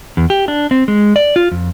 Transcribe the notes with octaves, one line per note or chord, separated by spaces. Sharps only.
E2
G4
D4
C4
G#3
D5
F4
F2